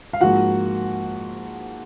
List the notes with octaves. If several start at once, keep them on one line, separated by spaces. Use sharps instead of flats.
F5
G#2 F3 A#3 F#4 F#5